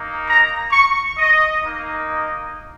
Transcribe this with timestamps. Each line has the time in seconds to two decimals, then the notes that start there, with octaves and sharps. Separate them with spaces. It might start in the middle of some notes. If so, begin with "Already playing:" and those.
Already playing: A#3 D#4
0.28 A#5
0.72 C#6
1.18 D#5
1.63 A#3 D#4
2.07 D#5